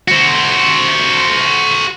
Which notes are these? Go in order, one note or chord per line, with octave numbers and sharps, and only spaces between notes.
F#4 C5